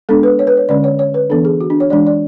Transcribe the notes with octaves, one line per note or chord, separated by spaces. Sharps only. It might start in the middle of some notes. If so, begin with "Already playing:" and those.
G#3 B3 D4 A4
B4
C#5
B4
C#5
D3 G#3 C#4 D5
C#5
C#5
B4
E3 B3 D4 A4
G#4
F#4
D4
C#5
E3 G#3 D4 D5
D5